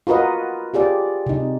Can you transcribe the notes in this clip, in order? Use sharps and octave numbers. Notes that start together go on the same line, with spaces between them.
F4 F#4 A#4 B4 D#5
F4 G4 G#4 D5
C3 D#4